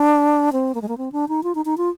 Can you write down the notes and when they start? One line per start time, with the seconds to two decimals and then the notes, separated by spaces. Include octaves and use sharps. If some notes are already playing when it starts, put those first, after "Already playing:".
Already playing: D4
0.52 C4
0.74 A#3
0.82 G#3
0.88 A#3
0.98 C4
1.12 D4
1.28 D#4
1.43 F4
1.55 D#4
1.65 D#4
1.77 F4